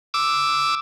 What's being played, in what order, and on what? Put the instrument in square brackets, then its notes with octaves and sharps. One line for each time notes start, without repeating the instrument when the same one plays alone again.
[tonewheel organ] D6 E6